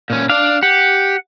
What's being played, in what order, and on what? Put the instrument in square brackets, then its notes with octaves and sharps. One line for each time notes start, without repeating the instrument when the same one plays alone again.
[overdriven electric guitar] A#2 C#4
[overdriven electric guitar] D4 D5 [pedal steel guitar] F5
[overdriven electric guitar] G4 [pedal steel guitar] F#5